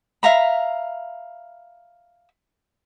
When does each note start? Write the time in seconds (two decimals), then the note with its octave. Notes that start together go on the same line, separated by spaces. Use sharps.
0.23 E5 F5 A#5 B5